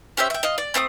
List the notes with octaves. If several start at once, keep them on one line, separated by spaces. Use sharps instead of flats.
C#4 G4 C5 E5
E5 G5
F4 D#5
D5
A3 C4 G5 D#6